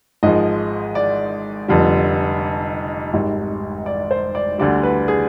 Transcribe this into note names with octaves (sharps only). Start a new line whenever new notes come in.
G#1 G#2 F3 G#3 D#5
D5
F1 F2 D3 G3
G#1 G#2 G3
D5
C5
D5
D2 D3 G3 D5
B4
G#4